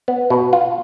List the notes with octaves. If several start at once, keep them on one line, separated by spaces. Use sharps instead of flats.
B3
B2
F4